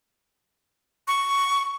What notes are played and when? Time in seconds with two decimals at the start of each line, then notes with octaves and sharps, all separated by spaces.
1.08 C#6